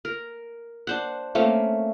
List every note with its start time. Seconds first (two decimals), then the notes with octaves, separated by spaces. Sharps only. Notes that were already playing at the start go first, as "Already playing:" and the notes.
0.05 A#4
0.87 D4 C5 F#5
1.35 A3 A#3 C4 C#4